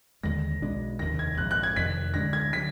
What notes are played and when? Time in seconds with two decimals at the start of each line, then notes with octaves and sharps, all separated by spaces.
0.23 D#2 D3 G#3 A#6
0.62 B1 B2 G#3 D4
0.99 F1 D#2 D#3 A#6
1.19 G#6
1.37 A#1 G#2 F3 F#6
1.51 F#6
1.63 G#6
1.76 F1 F2 D#3 B6
2.14 D2 D3 G#3 D4 A#6
2.33 G#6
2.53 D3 F#3 B6